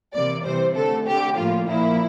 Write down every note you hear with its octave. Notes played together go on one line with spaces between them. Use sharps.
C3 E3 A#3 D5
C3 E3 G3 C5
D3 A3 A4
D3 A3 G4
A2 F3 A#3 F4
A#2 F3 A#3 E4